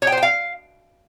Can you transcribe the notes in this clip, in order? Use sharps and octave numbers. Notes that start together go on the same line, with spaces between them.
C#5
G5
C5
G5
F5